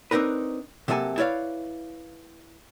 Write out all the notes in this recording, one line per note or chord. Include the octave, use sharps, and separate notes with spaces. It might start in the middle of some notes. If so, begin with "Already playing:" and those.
C4 D4 D#4 A#4 B4
C3 F#3 A#3 A4 G#5
E4 B4 C#5 D5 F5